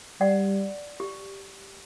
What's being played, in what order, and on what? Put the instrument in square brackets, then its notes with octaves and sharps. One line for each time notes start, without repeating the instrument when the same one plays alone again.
[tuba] G3 [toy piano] D5 F#5
[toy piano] G4